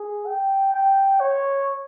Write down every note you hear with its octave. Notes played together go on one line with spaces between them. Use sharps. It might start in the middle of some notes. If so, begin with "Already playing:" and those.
Already playing: G#4
G5
G5
C#5